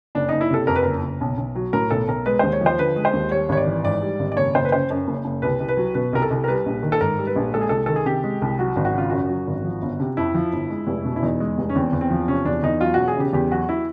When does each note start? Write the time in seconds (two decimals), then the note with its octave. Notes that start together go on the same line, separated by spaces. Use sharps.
0.15 F#1 D4
0.29 F#1 D#4
0.41 E4
0.51 C3 A4
0.67 F2 A#4
0.76 B4
0.83 F#1 A#4
1.03 F#1
1.21 B1
1.37 B1
1.55 F#3
1.73 A2 A#4
1.91 B1 A4
2.08 B1 A#4
2.26 G#3 B4
2.39 D#2 C5
2.53 C#5
2.61 F3
2.66 C5
2.78 D3 B4
2.96 G#3
3.05 C5
3.13 D#2
3.31 G3 C#5
3.49 G#1 C#5
3.57 D5
3.66 E3
3.84 G#2 D5
4.02 G3
4.19 G#1
4.32 D5
4.36 F#1 C#5
4.55 F#1 C5
4.65 B4
4.72 C#3 C5
4.90 F#2
5.07 F#1
5.25 F#1
5.42 C2 B4
5.60 C2
5.69 B4
5.77 F#3
5.95 B2 B4
6.13 C2 A#4
6.22 A4
6.30 C2
6.44 A#4
6.48 G3 B4
6.66 A#1
6.83 D#3
6.92 A4
7.01 G#2 A#4
7.18 G3
7.27 B4
7.36 A#1
7.54 G#3 A4
7.61 G#4
7.69 C2 A4
7.86 D#3 A4
7.96 G#4
8.05 C3 G4
8.24 G#3
8.42 C2
8.59 F#3 F#4
8.76 G#1
8.85 F#4
8.94 C#3 F4
9.10 F#2 F#4
9.29 F#3
9.47 G#1
9.64 F3
9.82 G1
10.00 C3
10.17 F2 E4
10.35 F3
10.53 G1
10.70 G#3
10.87 F1
11.05 B2
11.16 E4
11.22 E2 D#4
11.40 G#3
11.58 F1
11.69 C#4
11.75 E2 C4
11.93 E2
12.01 C4
12.10 F3
12.28 C3 C#4
12.45 E2 D4
12.63 E2 D#4
12.80 F#3 F4
12.94 E1 F#4
13.08 G#4
13.16 C#3 G4
13.33 E2 G4
13.51 F#3 F#4
13.69 E4